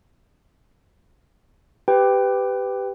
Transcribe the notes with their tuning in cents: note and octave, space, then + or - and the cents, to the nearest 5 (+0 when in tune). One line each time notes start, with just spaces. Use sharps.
G4 +0 B4 +20 G5 +0